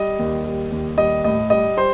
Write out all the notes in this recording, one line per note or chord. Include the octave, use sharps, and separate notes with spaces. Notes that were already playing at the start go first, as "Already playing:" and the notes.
Already playing: G3 D#5
D#2
G3
D#2
G3 D#5
A2 D#5
G3 D#5
G3 C5